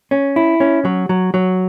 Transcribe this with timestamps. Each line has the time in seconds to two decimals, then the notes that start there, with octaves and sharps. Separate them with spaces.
0.11 C#4
0.36 E4
0.60 C#4
0.85 F#3
1.09 F#3
1.34 F#3